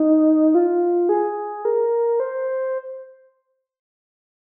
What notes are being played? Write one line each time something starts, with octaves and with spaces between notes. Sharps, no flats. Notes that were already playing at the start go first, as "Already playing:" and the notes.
Already playing: D#4
F4
G#4
A#4
C5